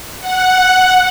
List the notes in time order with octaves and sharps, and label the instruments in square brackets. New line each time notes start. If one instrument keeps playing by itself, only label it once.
[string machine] F#5